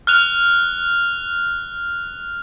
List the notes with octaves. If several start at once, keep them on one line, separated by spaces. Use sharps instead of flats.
F6 F#6 F7